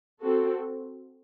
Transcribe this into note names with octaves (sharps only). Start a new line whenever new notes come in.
C4 F#4 A4